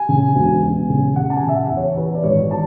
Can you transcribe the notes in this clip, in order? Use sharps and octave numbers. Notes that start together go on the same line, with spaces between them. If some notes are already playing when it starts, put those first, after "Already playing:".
Already playing: G#5
C#3
E1
E1
C#3
C#3 F#5
A5
G#5
C#3
E5
F#5
E2
C#5
E3 B4
D5
G#1 C#5
E3 A5